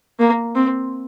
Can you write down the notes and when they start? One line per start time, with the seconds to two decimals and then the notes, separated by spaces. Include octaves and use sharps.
0.20 A#3
0.56 C4